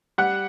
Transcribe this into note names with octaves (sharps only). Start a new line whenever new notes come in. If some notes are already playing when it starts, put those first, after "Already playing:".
G3 F#5